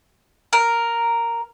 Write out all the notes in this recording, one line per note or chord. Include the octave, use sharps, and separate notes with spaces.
A#4